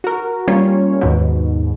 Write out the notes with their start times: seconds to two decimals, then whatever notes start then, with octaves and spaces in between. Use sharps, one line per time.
0.04 F#4 A#4
0.48 G3 A#3 C#4 F4 C#5
1.01 D#2 G#2 B2